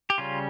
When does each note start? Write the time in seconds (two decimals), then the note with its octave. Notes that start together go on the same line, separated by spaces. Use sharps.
0.10 G4
0.18 C#3 G3 C#4 F4